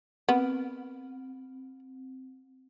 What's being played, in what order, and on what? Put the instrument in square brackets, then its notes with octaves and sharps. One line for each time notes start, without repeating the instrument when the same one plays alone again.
[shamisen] B3 [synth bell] C4